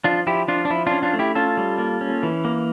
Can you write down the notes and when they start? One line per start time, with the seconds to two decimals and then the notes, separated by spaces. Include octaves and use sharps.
0.04 F3 D4 F4
0.27 F3 E4 G4
0.48 F3 D4 F4
0.65 D4
0.70 F3 E4
0.87 C#4 D4 F4
1.03 D4 F4
1.14 A3
1.19 E4 G4
1.35 C#4 F4 A4
1.57 G3
1.78 A#3
2.01 C#4
2.23 E3
2.45 A#3